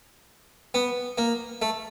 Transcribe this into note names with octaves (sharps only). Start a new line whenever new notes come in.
B3
A#3
A3